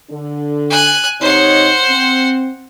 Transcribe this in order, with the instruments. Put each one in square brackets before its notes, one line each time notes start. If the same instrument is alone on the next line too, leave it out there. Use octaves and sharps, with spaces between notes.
[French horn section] D3
[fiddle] G#5 F#6
[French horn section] C3 D#4 C#5 [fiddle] C5 F#5
[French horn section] C4